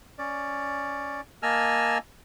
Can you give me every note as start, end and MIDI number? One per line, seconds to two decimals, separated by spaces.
0.18 1.21 61
0.18 1.21 74
1.43 1.98 58
1.43 1.98 75
1.43 1.98 80
1.43 1.98 81
1.43 1.98 88
1.43 1.98 89